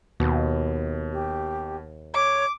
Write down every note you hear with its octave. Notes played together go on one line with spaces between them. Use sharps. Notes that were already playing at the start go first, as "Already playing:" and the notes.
D#2 B2
G4
C#5 D6